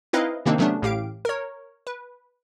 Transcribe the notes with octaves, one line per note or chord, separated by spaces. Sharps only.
C4 D#4 E4 B4 D#5 F5
C3 D#3 A#3 C4 D4 D#4
C3 F#3 A3 B3 C#4 D4
A1 A2 G4 F5 D7
A#4 C#5
B4